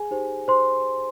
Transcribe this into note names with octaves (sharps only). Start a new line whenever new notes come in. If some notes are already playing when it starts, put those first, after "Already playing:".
Already playing: G#4 G#5
D#4 G4 C5
D#4 C5 C6